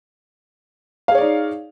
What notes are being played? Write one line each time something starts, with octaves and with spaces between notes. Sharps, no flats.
D#4 G#4 C#5 D5 F5